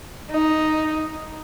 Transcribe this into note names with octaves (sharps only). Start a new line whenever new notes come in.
D#4